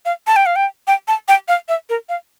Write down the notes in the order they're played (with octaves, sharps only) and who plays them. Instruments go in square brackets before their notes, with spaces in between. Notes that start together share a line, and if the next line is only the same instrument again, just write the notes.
[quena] F5
A5
G5
F5
G5
G5
A5
G5
F5
E5
A#4
F5